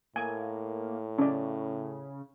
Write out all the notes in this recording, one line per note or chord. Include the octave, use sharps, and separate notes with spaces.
A2 A#3 G#5
C#3 C#4 D5